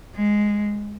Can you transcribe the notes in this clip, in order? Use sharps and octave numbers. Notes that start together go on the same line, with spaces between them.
G#3